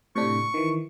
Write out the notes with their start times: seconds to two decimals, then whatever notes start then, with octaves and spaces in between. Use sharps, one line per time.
0.16 A2 C3 D4 C#6
0.54 D#3 E3